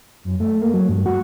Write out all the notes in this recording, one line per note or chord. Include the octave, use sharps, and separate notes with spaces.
F#2
A3
A#3
F#3
G2
F#4